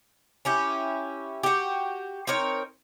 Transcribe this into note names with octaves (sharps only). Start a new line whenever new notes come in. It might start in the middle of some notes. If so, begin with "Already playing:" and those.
C#4 E4 G4
F#4 G4
C4 D#4 A#4 C#5